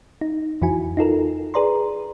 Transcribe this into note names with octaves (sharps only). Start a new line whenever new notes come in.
D#4
F2 E3 E4 F#4 G#5
D#4 F4 A4 A#4
G#4 B4 D5 A#5 C6